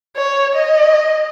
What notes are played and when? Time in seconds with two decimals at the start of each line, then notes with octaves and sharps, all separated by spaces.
0.16 C#5
0.54 D#5